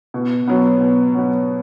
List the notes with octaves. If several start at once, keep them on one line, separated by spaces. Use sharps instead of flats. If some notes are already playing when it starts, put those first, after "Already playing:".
B2
F#3 B3
B2
F#3 B3